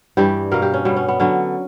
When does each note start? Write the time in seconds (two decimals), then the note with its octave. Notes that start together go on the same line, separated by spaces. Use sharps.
0.17 G2 E3 G3 G4
0.51 B2 A#3 A#4
0.62 G4
0.74 C#4
0.85 B2 G3 B3
0.96 C#4
1.08 B3
1.20 D3 F#3 B3 C#4